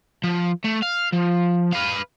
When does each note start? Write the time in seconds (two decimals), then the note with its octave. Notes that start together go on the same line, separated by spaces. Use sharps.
0.24 F3
0.65 A3
0.83 F5
1.13 F3
1.73 B4 F5